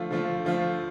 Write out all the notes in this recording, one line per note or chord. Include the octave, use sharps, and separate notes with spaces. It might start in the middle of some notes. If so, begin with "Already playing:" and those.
Already playing: D3 F3 A3 F4
D3 F3 A3 F4
D3 F3 A3 F4